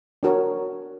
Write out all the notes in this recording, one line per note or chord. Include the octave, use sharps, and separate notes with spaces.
D4 F#4 A#4 C#5